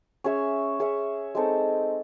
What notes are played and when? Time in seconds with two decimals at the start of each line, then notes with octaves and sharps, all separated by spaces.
0.24 C#4 G#4 C#5 E5
0.79 C#4 G#4 C#5 E5
1.35 G#3 C4 D#4 A4